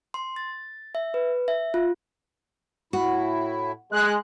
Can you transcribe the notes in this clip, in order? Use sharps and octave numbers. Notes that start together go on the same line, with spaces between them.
C6
A6
E5
B4
E5
F4
A2 E4 F#4
G#3 F#6